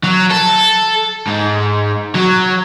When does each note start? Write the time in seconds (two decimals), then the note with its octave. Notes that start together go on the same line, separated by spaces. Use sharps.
0.04 F#3
0.31 A4
1.27 G#2
2.15 F#3